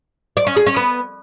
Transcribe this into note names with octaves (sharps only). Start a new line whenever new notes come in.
D5
C#4
G#4
C#4
B3